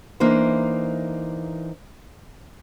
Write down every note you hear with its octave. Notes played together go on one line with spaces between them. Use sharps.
E3 A#3 D4 D#4 C5